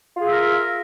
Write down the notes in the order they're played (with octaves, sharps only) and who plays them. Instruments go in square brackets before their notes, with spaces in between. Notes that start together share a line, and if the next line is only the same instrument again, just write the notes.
[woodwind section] F4
G#4
E5
A#4